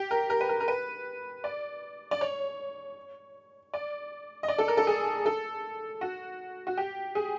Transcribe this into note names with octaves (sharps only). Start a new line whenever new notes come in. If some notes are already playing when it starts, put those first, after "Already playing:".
Already playing: G4
A#4
A#4
B4
A#4
A#4
B4
D5
D5
C#5
D5
D#5
D5
A4
A#4
A4
G#4
A4
F#4
F#4
G4
G#4